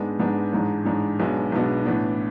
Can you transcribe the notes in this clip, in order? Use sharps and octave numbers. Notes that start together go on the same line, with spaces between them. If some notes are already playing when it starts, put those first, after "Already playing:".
Already playing: G#2 G#3 B3 D4
G#2 G#3 B3 D4
A1 G#2 G#3 D4
A1 G#2 G#3 D4
B1 B2 G#3 B3 D4
B1 B2 G#3 B3 D4
A2 E3 B3 D4